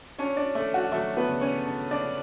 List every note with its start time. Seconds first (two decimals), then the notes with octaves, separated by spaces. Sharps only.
0.19 C#4 D4 C#5
0.37 D4 D5
0.55 A3 A4
0.74 F#4
0.92 F#3 A3 A4
1.17 B3 B4
1.29 C#3
1.41 C#4 C#5
1.67 D4
1.91 D4 D5
2.03 A3